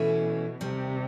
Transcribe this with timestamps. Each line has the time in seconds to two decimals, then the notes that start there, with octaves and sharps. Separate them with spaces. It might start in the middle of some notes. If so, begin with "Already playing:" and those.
Already playing: B2 E3 A3 C#4 E4
0.61 D#2 C3 D#3 G3